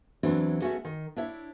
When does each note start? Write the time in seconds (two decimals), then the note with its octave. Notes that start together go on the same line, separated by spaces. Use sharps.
0.23 E2 E3 F#3 C4 D4
0.61 A3 B3 C#4 F#4 G#4
0.85 D#3
1.16 D4 E4 C#5 E5